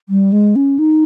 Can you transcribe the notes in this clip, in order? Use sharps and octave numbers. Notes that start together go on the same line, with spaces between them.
G3
G#3
C#4
D#4